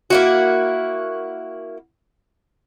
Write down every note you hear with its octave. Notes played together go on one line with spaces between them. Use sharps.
A#3 E4 F#4